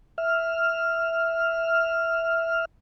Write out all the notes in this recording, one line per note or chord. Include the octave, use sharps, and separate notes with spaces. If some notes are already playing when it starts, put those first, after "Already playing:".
E5 F6